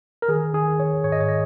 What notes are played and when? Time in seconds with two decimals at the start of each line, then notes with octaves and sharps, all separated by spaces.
0.22 A#4
0.28 D#3 G#4
0.53 D#3 G#4
0.79 D#3 C#5
1.04 G#2 C#5
1.12 D#5
1.20 C#5
1.29 D#3 D#5